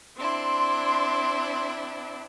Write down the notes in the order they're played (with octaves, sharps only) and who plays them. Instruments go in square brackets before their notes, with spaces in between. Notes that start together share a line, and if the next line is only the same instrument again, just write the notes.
[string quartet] C4 D4 E4 [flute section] C6